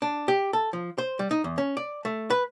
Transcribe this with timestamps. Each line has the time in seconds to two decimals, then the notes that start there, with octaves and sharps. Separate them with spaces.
0.02 D4
0.28 G4
0.53 A4
0.73 F3
0.98 C5
1.19 G3
1.31 D#4
1.44 E2
1.58 C#4
1.77 D5
2.05 A3
2.30 B4